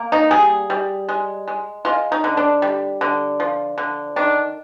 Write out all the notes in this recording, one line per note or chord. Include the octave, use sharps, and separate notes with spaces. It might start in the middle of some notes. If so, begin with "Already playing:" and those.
Already playing: A#3
D#4
G3 G#4
G3
G#3
G#3
G#3 F4
D#4
D3
D4
G3
D3
F3
D3
D#3 D4